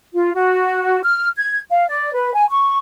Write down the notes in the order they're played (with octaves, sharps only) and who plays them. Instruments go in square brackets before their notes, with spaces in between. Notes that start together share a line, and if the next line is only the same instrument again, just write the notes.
[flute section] F4
F#4
F6
G#6
F5
D5
B4
G#5
C#6